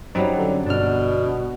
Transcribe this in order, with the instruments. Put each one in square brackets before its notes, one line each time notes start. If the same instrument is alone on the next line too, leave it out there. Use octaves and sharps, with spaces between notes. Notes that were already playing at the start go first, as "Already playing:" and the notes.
[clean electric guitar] F#2 [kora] F#3 G3 D5 [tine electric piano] C4 D#4
[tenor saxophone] D3
[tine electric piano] G1 F6 [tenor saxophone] B2 [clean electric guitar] D4